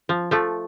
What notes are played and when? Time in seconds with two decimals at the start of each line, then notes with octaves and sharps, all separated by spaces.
0.09 F3
0.31 F3 A3